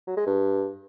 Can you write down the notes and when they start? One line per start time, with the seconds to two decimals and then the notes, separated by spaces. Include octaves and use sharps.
0.07 F#3
0.17 G#3
0.26 G2